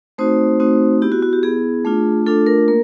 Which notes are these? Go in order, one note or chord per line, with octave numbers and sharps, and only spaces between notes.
A3 C4 D#4 F#4 C5
A3 C4 D#4 F#4
B3 E4 G4
F#4
F#4
G4
B3 E4 G#4
A3 D4 F4
A3 D4 F4 A4
A#4
A#3 A#4